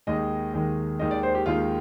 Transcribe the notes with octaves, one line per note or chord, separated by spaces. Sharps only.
D#2 D#3 G#3 D#5
D#2 D#3 G#3
D#2 D#3 G#3 D#5
D5
C5
G4
D#2 D#3 G#3 F4